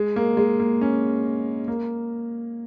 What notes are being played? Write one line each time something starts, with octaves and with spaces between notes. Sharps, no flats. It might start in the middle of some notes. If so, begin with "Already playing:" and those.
Already playing: G#3
A#3
G#3
A#3
C#4
A#3